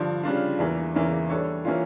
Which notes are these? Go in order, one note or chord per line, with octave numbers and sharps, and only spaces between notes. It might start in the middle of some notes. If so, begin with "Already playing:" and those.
Already playing: G2 D3 F3
C#3 G3 D4 F4
E2 E3 A#3
E2 C#3 E3 A#3
G3 D4 A4 C#5
E3 A#3 C#4 F4